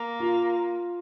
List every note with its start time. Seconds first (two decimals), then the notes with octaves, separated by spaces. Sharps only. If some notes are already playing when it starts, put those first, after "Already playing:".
Already playing: A#3
0.20 F4